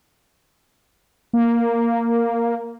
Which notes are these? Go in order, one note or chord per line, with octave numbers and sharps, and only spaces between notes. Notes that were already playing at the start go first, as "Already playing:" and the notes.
A#3